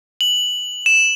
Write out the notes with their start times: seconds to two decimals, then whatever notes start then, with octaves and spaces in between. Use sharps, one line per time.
0.21 F#7
0.86 E7